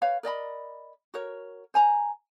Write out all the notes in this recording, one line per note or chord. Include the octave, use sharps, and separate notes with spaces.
B4 C#5 F5
A#4 D5 D#5 B5
F#4 A#4 C#5
C5 G#5 A#5